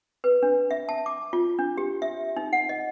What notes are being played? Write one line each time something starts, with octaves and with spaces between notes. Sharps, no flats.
B4
D4
E5
A5
D6
F4
D4
G4
E5
D#4
F#5
D#5